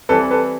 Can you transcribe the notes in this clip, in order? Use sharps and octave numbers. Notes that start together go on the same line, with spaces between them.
E3 G3 C4 A4 B4
A4 B4